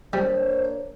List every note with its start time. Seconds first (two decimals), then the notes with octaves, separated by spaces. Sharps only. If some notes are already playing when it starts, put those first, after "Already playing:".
0.13 G3 A#3 D4 C5 C#5